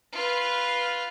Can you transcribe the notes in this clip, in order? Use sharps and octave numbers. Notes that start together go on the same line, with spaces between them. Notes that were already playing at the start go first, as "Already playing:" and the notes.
F4 B4